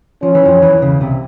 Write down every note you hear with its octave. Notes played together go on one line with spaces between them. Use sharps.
F3 C#4
E3
F2 F3
E2 E3
C#2 C#3
C2 C3